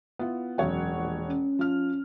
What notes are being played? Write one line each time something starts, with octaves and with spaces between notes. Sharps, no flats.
B3 E4 F4
E1 F#2 C#5 F#5
A#1
C#4
F3 F6